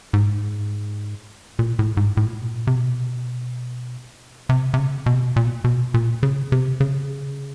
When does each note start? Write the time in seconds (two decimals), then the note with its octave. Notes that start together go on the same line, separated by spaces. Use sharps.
0.13 G#2
1.59 A#2
1.79 A2
1.97 G#2
2.17 A2
2.26 A#2
2.34 A2
2.42 B2
2.46 A#2
2.67 C3
2.75 B2
4.49 C3
4.74 C3
4.77 C#3
5.06 B2
5.14 C3
5.21 B2
5.36 A#2
5.45 B2
5.54 A#2
5.64 B2
5.94 A#2
6.23 C#3
6.52 C3
6.80 C#3